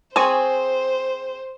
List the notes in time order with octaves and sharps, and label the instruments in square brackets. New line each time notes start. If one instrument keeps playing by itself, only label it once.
[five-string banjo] C4 G#4 [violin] C5 [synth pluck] G#5 C#6